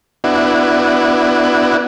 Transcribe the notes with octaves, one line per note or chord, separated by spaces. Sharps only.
B3 D4 E4 F#4